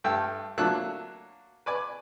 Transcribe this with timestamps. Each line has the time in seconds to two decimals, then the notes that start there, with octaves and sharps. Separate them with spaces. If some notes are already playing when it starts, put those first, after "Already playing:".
0.04 G2 A3 G5 E6
0.58 F#3 A3 A#3 D4 E6 F#6
1.66 B4 D5 G#5